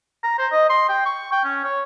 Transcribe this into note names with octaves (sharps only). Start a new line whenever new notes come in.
A#5
C5
D#5
C6
G5
C#6
G5
C#4
C#5